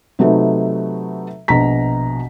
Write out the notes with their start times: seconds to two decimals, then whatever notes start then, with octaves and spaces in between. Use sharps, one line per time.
0.19 C3 F#3 A3 D#4 B4
1.48 A#1 B2 A#5 B6